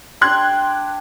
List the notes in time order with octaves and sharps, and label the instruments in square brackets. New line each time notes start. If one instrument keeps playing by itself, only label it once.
[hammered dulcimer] D4 G4 [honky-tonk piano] C6 F#6 G#6